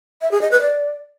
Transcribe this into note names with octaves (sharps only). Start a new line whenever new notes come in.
E5
G#4
D#5
B4
D5